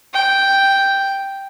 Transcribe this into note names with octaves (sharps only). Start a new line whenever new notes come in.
G5